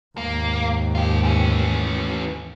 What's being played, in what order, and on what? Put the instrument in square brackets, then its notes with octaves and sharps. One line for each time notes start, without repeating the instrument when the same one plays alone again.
[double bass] D#2 G#2 [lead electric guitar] A#3
[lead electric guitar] F4 G4
E3 C#4